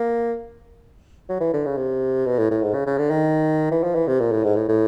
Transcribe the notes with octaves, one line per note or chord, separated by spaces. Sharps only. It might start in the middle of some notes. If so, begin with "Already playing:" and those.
Already playing: A#3
F#3
E3
D3
C#3
C3
B2
A2
A2
G#2
C#3
C#3
D3
D#3
E3
F3
E3
C3
A#2
A2
G#2
A2
A2